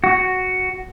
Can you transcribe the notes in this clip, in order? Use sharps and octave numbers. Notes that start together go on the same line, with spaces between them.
F#4